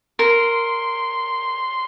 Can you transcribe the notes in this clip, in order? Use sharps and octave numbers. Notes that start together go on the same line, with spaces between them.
A#4 C6